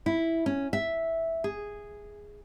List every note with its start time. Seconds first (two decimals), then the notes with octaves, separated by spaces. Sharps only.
0.06 E4
0.46 C#4
0.73 E5
1.44 G#4